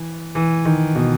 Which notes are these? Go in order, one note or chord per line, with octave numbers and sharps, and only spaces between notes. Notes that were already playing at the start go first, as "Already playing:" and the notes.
Already playing: E3
E3
D#3
B2